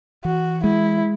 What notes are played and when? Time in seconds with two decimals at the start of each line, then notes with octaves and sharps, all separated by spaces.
0.25 E3 F#4
0.64 G#3 E4